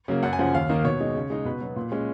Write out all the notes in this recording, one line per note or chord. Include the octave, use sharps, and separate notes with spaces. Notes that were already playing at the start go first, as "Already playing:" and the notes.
C#3 F#3 A#3
F#2 F#5
G#5
C#3 F3 F#5
D#2 F5
D#3 A#3 D#4 D#5
B2 C#5
G#3 D#4
C#3
G#3 D#4
B2 B4
F#3 B3
A#2
G#3 C#4